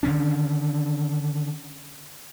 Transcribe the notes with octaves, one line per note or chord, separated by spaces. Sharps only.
D3 D#3 C#4 D4